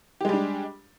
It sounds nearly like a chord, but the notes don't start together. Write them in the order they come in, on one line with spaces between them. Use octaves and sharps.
G4 G#3 G3 D4